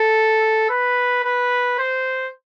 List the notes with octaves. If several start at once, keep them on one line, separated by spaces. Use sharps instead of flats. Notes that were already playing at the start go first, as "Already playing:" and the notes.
Already playing: A4
B4
B4
C5